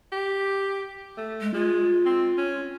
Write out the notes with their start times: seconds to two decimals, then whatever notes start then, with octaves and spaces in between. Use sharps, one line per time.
0.12 G4
1.18 A3
1.41 G#3
1.54 G#3 F4
2.06 C4
2.38 C#4